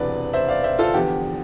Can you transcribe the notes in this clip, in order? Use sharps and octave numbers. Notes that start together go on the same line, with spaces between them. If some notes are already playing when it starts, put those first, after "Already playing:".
Already playing: E1 D2 C3 E3 B4 D5
C5 E5
D5 F5
C5 E5
F4 A4
E2 D3 F3 B3 G4